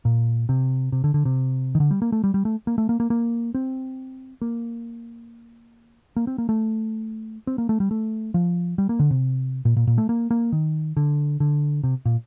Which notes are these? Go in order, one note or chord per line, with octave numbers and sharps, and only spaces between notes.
A#2
C3
C3
D3
D3
C3
D#3
D3
G3
A#3
A3
G3
G3
A3
A#3
A3
A#3
A#3
A#3
C4
A#3
A#3
C4
A#3
A3
C4
A#3
A3
G3
A3
F3
G3
A#3
D3
C3
A#2
A#2
A#2
A3
A#3
A#3
D#3
D3
D3
C3
A#2